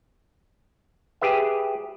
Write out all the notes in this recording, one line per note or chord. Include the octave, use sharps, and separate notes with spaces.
G4 G#4 B4 E5